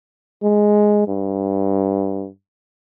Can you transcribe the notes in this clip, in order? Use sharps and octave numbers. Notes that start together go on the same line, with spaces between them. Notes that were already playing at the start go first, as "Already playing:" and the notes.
G#3
G2